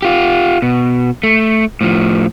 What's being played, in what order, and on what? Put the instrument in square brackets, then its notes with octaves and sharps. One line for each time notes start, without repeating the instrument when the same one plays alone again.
[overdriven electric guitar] F4 G4
B2
A3
A2 F3